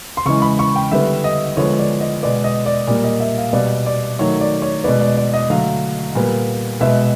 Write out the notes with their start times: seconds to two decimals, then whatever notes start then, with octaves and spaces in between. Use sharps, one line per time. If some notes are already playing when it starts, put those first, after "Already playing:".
0.17 C6
0.25 C#3 E3 G#3 C#6
0.42 B5
0.59 C#6
0.76 G5
0.91 D3 G3 B3 E5
1.24 D#5
1.57 D3 F3 G#3 B3 C#5
1.79 D5
2.01 D#5
2.23 B2 G#3 B3 D5
2.44 D#5
2.66 D5
2.87 A#2 G3 A#3 D5
3.04 D#5
3.20 E5
3.38 F5
3.53 B2 G3 B3 D5
3.86 D5
4.19 D#3 F#3 A3 C#5
4.41 D5
4.62 C#5
4.84 B2 G#3 B3 D5
5.01 D5
5.17 D5
5.33 D#5
5.50 D3 F#3 A3 F5
6.15 A#2 G3 B3
6.81 B2 G#3 B3 E5